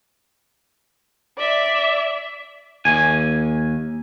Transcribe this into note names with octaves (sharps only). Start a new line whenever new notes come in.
D5 E5
D#2 G#5